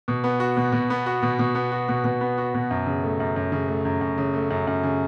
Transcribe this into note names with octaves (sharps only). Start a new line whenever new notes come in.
B2
B3
F#4
B2
B2
B3
F#4
B2
B2
B3
F#4
B2
B2
B3
F#4
B2
F#2
C#3
A3
F#2
F#2
C#3
A3
F#2
F#2
C#3
A3
F#2
F#2
C#3